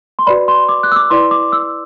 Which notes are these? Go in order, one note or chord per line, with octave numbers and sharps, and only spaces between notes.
C6
F#4 B4 D5 B5
C6
D6
F#6
E6
D6
E4 B4 D5 C6
D6
E6